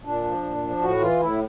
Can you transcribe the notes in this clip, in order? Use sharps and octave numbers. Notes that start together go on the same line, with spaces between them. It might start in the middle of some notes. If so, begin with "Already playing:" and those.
A#2 D4
F3
A#2
F3
A2 F#4
E3 F4
A2 E4